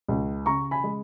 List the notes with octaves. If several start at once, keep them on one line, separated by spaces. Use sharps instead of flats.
C#2
C#3 A#5 C#6
G#5 B5
G#3